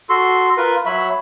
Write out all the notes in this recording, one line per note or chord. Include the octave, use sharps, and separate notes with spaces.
F#4 A4 C6
F4 A#4 B4
F#3 E5 B5